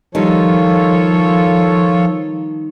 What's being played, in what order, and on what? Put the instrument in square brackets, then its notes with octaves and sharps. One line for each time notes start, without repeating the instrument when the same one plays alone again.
[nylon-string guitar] D#3 G3 [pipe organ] F3 [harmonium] F4 A4 C#5